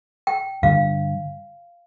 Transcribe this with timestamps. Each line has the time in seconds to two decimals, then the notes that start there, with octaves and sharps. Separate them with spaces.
0.27 G5
0.63 G2 D3 G3 F5